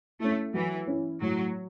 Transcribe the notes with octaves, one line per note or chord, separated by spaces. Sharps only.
A3 C#4 E4
E3 F#3
C#4 E4
A2 F#3